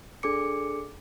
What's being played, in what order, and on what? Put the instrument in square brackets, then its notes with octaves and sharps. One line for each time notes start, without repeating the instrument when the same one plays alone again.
[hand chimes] D4 G#4 A4 D6 C#7